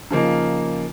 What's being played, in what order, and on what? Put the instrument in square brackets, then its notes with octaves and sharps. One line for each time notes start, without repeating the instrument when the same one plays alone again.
[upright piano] C#3 F3 A#3 D#4